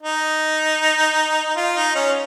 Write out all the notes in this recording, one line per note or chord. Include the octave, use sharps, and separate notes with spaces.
D#4
F4
D#4
C#4